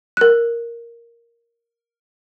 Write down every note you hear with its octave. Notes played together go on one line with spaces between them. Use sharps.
A#4 F#6